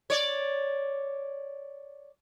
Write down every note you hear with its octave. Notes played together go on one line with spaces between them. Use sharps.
C#5 D5